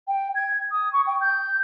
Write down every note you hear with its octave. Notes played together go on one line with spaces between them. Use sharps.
G5
G#6
D#6
C#6
G5
G6